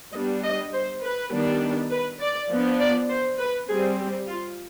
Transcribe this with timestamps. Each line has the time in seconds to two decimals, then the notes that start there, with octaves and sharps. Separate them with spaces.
0.13 G3 B3 D4 D#5
0.43 D#5
0.73 C5
1.03 B4
1.32 D#3 G3 B3 D4
1.91 B4
2.20 D5
2.50 F3 B3 D4
2.80 D5
3.09 C5
3.39 B4
3.68 G3 C4 G#4
3.98 G4
4.28 F4